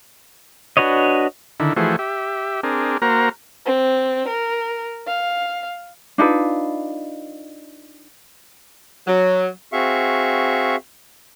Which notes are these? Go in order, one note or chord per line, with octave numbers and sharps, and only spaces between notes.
D4 F#4 B4 C#5 D#5
D3 D#3 E4
E3 F3 A3 F#4 G#4 C5
G4 E5
C4 D4 G#4 A#4
A#3 F#4 A#4 C5 A#5
C4
A#4
F5
D4 D#4 F4 B4
F#3
C4 F#4 G#4 E5 F5 C#6